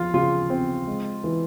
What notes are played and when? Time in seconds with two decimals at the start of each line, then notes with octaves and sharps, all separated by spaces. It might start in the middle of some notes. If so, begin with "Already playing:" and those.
Already playing: F3 F4
0.14 C#3 F4
0.50 C4
0.87 G#3
1.24 E3